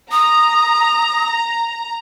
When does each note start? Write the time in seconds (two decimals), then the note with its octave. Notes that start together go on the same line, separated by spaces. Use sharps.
0.12 A#5 D#6